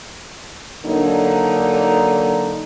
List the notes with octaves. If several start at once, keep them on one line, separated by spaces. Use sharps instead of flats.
D3 F#3 A#3 D4 D#4